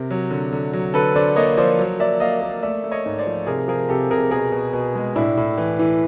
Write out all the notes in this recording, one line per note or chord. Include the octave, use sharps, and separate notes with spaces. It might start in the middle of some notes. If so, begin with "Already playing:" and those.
Already playing: C3 A#4
F#3
D3
D3
F#3
D3 A4 B4
D3 C5 D5
A#3 C#5 D#5
F3 C5 D5
F#3
A#3 D5 E5
A#3 D#5 F5
A#3
A3 D5 E5
A3
C#5 D#5
G#2
C5 D5
F3
C3 G#4 A#4
F3 G#4 A#4
C3 G4 A4
C3 G#4 A#4
B2 G#4 A#4
B2
B2
G#3
A2 D4 E4
A2
E3
E3